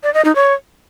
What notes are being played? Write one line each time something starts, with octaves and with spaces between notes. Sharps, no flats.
D5
D#5
D#4
C#5